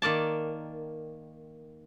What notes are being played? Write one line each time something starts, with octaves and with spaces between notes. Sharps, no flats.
D#3 A#3 D5 A5